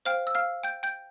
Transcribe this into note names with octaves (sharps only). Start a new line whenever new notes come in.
C5 F5 G5 F6
E6
F5 F6
G5 G6
G5 G6